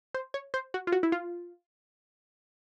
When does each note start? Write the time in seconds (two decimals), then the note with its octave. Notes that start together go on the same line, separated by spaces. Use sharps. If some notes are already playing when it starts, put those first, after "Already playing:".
0.14 C5
0.34 C#5
0.54 C5
0.74 F#4
0.87 F4
0.92 F#4
1.03 E4
1.12 F4